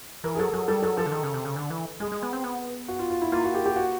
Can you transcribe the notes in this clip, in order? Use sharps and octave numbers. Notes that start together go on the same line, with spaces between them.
E3 A#4
G#4
F#3 A4
F#3 G#4
G3 A4
F#3 A4
F3 A4
D3
D#3
C#3
C3
C#3
D3
E3
G#3 G#4
G#3
B3
C4
B3
F#4
F4
F4
E4
A#3 F4
F#4
G4
G4
F#4